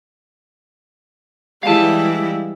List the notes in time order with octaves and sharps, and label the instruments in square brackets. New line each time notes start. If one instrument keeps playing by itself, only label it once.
[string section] E3 G3 [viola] G#3 E4 [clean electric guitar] F5 A5